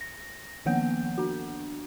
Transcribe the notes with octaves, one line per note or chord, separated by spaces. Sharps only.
A#6
D#3 F3 A#3 B3 F#5 G6
D4 F#4